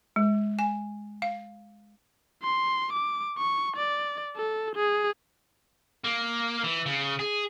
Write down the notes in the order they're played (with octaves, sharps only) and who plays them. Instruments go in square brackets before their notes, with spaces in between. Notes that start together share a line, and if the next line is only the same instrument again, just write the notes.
[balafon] G#3
G#5
F5
[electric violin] C6
D6
C#6
D5
A4
G#4
[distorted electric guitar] A#3
E3
C#3
G#4